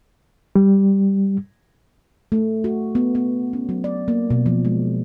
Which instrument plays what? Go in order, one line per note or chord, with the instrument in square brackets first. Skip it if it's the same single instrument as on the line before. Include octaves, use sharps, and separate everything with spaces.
[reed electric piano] G3
[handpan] A3
F#4
B3
B3
C#4
F#3
D5
A#3
B2
F3
G#3